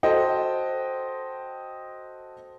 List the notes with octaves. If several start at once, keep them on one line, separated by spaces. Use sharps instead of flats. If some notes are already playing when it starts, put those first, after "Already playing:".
F#4 A4 C5 D#5 G5